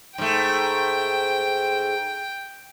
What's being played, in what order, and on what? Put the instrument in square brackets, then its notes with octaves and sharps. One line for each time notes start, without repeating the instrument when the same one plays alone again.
[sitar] G#2 A3 [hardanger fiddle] G5